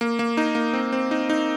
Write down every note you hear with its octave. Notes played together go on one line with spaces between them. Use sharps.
A#3
A#3
D#4
A#3
C4
C4
D#4
D#4